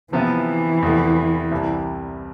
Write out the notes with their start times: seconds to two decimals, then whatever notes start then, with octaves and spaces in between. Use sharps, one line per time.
0.13 C3 E3 F3 B3 E4
0.82 E2 C3 F3 A3
1.51 C2 C3 G3 C4 E4